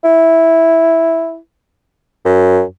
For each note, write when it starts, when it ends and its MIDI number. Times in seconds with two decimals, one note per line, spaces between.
0.04 1.37 64
2.25 2.62 42